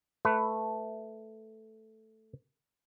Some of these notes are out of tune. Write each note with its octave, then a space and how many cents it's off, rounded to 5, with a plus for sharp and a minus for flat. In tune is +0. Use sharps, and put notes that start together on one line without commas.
A3 +0 B4 +15